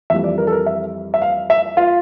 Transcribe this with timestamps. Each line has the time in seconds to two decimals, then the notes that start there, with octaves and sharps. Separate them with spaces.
0.10 F2 E3 G3 E5
0.24 D5
0.38 A#4
0.47 A4
0.52 A#4
0.66 E5
1.14 E5
1.22 F5
1.50 E5
1.77 F4